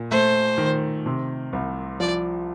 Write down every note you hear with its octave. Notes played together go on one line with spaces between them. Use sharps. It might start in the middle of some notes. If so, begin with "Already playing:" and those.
Already playing: A#2
A3 C5
D#3
C3
C2
F3 D5